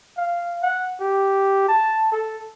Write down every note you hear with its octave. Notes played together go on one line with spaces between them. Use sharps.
F5
F#5
G4
A5
A4